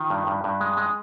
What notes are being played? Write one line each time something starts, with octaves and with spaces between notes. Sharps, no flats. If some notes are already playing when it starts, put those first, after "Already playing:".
Already playing: D#3 F4
G2
G2
G2
G#3
G#3